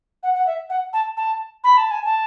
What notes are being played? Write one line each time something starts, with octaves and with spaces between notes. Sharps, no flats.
F#5
F#5
E5
F#5
A5
A5
B5
A5
G#5
A5